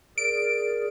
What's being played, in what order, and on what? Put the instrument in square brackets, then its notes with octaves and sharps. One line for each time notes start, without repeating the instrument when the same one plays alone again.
[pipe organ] G#4 A#4 D5 [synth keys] D7